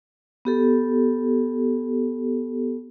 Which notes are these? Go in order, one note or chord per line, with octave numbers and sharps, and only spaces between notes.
B3 G4 A4